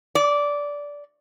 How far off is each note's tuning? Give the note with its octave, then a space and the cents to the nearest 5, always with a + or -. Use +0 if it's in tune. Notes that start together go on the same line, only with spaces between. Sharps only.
D5 -15